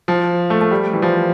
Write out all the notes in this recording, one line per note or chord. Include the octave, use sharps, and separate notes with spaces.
F3
A3
A3
G3
E3
F3